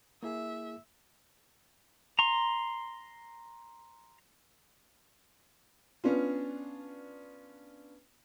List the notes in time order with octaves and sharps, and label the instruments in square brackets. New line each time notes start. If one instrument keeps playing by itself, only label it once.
[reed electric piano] A#3 E4 G#4 [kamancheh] E5
[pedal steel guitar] A#5 C6
[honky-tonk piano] B3 C#4 D4 F4